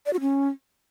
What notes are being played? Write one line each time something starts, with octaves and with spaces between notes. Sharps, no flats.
D5
F#4
C#4